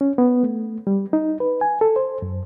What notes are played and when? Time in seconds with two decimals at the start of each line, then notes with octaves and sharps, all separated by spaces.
0.01 C#4
0.18 B3
0.43 A3
0.87 G3
1.13 D#4
1.40 B4
1.61 G#5
1.81 A4
1.96 C5
2.22 F#2